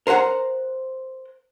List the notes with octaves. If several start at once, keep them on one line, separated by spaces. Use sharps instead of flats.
A#4 C5 D#5 F#5 A#5